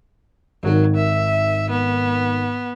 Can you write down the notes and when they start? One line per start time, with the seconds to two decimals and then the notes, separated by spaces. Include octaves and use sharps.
0.63 G#1 D#3 F#3
0.96 E5
1.70 B3